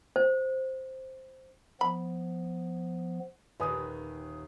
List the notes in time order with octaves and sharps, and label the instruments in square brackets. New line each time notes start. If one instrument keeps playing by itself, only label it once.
[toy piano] C5
[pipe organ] F3 B3 [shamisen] B5
[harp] D#1 D#2 [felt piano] B4 G#5 D#6